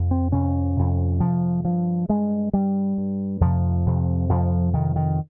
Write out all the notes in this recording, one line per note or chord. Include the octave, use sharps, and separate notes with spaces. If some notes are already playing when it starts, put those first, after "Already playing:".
Already playing: F2 C3
C4
F2 C3 C#4
F2 C3
F2 C3 F3
G2 F3
G2 G#3
G2 G3
G2
F2 C3 F3
F2 C3
F2 C3 F3
F2 C3 D#3
D#3